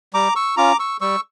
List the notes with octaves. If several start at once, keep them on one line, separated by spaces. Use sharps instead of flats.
G3 A#5 D6
C#6 E6
C#4 F4 A#5 D6
C#6 E6
G3 C#6 E6